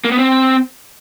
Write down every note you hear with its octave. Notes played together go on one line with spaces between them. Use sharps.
A#3
B3
C4